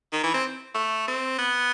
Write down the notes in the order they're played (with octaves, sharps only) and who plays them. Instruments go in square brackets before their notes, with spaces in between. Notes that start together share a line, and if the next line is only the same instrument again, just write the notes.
[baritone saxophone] D#3
E3
C4
A3
C4
B3